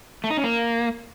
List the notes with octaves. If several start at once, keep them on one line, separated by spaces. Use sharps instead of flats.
A3
D#4
C#4
A#3